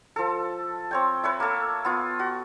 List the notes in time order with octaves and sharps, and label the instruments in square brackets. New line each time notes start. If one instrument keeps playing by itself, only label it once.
[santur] F3 A4
C4 C#5 G5
B4 C#5 E5
A#3 A4
B3 F4
F#4